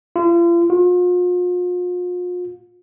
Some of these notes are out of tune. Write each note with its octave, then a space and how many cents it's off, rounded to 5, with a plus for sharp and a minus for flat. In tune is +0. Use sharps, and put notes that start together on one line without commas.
F4 -40
F4 +40